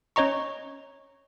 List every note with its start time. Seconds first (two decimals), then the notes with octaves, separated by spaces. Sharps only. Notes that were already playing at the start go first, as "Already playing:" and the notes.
0.16 C#4 C#5 D#5 A#5 C#6